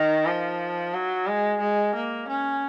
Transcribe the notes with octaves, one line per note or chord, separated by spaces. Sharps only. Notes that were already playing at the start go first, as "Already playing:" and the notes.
Already playing: D#3
F3
F#3
G#3
G#3
A#3
C#4